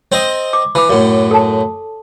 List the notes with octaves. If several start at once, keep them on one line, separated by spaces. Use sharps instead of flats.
C4 C5 D#5
D6
E3 B5 D6
F#2 A2
A4 A5